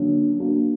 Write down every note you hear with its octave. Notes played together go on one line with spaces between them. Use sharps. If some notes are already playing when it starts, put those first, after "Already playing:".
Already playing: D3 F#3 A#3 C#4
A#3 D4 F#4